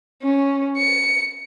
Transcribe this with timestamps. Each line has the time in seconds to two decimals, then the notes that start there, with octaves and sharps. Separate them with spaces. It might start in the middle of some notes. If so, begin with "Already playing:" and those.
0.22 C#4
0.77 C#7